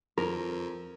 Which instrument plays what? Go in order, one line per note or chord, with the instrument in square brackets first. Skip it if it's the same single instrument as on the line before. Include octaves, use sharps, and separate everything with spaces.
[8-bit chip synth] F2 [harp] A#4